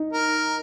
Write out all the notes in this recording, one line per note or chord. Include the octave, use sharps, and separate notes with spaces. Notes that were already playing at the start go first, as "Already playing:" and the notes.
Already playing: D#4
A#4